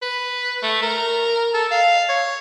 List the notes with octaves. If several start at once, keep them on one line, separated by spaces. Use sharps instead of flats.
B4
A3
A#4
A4
F5
C#5